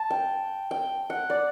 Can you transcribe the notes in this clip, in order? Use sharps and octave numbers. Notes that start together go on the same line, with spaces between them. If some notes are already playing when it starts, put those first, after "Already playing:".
Already playing: A5
G5
G5
F#5
D5